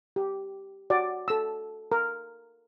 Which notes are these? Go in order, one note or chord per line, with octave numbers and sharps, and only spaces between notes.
G4
F#4 D5
A4 E6
A#4